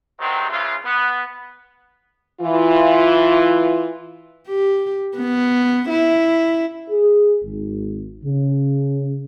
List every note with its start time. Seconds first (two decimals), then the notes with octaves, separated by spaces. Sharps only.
0.20 G2 C3 D#3 F#3 G#3 C4
0.50 C#3 E3 F4
0.84 B3
2.41 E3 F4
4.48 G4
5.18 B3
5.89 E4
6.91 G#4
7.43 G#1
8.25 C#3